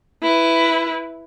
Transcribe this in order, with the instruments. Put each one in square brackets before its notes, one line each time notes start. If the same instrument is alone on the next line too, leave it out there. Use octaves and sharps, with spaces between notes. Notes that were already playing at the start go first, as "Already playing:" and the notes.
[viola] E4 B4